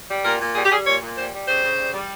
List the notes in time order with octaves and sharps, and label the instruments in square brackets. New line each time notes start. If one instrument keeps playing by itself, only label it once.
[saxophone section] G3
A#2 A#4
A#2
G3 G#4
G4
G3 G#4
A#2 C#5
A#2
G3 C5
G3
C#3 C5
C#3
G3
G3